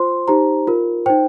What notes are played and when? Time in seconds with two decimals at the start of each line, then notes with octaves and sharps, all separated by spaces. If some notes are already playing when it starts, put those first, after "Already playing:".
Already playing: F4 C5 C6
0.28 D#4 G4 C5 A#5
0.67 F4 A#4
1.06 D#4 C5 G5